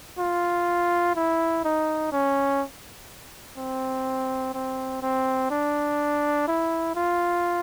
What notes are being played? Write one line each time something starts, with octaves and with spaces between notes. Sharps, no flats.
F4
E4
D#4
C#4
C4
C4
C4
D4
E4
F4